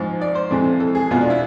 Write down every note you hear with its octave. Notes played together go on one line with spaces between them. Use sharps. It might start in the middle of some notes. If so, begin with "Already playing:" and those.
Already playing: G#2 F3 G#3
D5
C5
F2 C3 E3 G#3
A4
G#4
E2 B2 G#3 F4
D4
E4